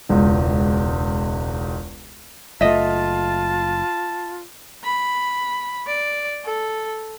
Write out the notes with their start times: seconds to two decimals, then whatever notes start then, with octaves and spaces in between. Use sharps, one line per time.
0.09 E1 C#2
2.61 F#1 A3 F4 D#5 E5 A5
4.84 B5
5.87 D5
6.44 A4